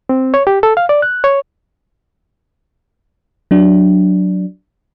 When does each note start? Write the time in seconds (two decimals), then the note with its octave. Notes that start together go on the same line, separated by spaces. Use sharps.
0.09 C4
0.34 C#5
0.47 G4
0.63 A4
0.77 F5
0.89 D5
1.02 F#6
1.24 C#5
3.51 F#3 D4